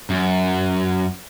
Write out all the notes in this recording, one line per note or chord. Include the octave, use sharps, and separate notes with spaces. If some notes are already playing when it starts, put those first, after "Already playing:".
F#2